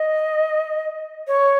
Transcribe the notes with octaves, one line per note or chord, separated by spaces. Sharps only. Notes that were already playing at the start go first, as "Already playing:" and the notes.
Already playing: D#5
C#5